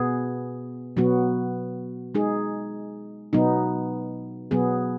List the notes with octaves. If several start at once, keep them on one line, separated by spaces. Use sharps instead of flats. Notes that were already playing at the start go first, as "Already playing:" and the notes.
Already playing: B2 B3 G#4
B2 F#3 B3 F#4
G#3 D#4 G#4
B2 F#3 B3 D#4
B2 F#3 B3 G#4